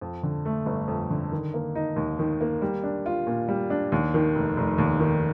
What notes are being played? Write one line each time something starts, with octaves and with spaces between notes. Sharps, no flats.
F2
D3
A3
G1
F2
D3
D#3
A#3
D#4
D#2
D#3
A#3
G3
D4
F4
A#2
G3
D4
D#2
D#3
F1
F1
D#2
D#3